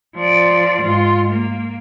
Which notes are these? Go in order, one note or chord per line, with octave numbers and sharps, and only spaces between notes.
F3 D5
G#2 F4
A#3